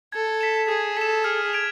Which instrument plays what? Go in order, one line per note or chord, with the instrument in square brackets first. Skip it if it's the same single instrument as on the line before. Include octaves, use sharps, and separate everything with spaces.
[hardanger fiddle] A4 [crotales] G#6
[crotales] B6 E7
[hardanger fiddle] G#4 [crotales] G#6
[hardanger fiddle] A4 [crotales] B6 E7
[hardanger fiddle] G#4 [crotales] F6
[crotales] G#6 D7 F7